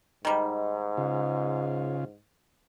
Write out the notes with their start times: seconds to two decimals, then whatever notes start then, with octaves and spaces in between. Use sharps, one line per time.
0.25 G#2 D#3 G3
0.97 C#3 F4